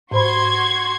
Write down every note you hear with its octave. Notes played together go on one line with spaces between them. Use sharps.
G#2 F#4 C5 B5 C6 G#6